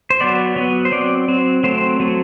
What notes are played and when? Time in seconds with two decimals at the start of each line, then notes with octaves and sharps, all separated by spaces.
0.10 C5
0.21 F#3 B3 D5
0.56 F#3 B3
0.85 C5
0.92 F#3 C4 D5
1.29 F#3 C4
1.63 F#3 A3 C4 C5
2.00 F#3 A3 C4